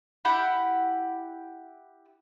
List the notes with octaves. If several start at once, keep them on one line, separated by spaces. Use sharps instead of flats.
E4 G4 F#5 B5